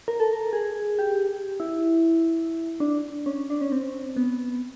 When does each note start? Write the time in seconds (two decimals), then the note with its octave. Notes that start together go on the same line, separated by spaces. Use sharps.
0.08 A#4
0.20 A4
0.33 A#4
0.53 G#4
0.99 G4
1.60 E4
2.80 D4
3.26 C#4
3.50 D4
3.61 C#4
3.72 C4
4.16 B3